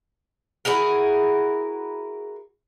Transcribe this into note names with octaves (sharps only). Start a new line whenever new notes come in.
E4 F#4 G#4 A#4